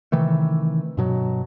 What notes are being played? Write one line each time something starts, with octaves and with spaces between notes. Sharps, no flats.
C3 D#3 E3 A3
G2 B2 F#3